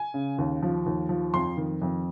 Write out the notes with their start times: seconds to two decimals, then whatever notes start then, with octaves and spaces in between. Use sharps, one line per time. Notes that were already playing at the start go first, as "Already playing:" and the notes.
Already playing: G#5
0.14 C#3
0.38 D#2
0.63 F3
0.86 D#2
1.09 F3
1.34 F2 C6
1.57 D#3
1.82 F2